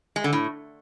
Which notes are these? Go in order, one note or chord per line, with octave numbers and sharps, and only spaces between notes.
G#3
D3
A2